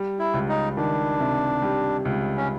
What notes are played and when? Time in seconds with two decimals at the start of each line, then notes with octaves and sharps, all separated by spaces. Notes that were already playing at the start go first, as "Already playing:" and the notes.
Already playing: G3
0.19 E4
0.34 C#2
0.49 D#4
0.77 D#3 D4
1.20 C3
1.62 G3
2.05 C#2
2.37 C#4